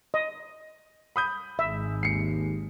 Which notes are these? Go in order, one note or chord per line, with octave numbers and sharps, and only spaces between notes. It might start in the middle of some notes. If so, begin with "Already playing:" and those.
D#5
B5 D#6 G6
G#1 G#3 E5
D#2 C7 C#7